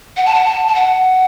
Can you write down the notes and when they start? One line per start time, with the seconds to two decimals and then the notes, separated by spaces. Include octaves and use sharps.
0.17 F#5
0.26 A5
0.35 F#5
0.46 A5
0.68 A5
0.75 F#5